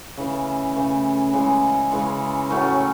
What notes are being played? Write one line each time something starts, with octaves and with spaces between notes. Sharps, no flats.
C#3 E3 A3
C#3 E3 A3
C#3 E3 G#3
C#3 E3 G#3
A2 F#3 A3 C#4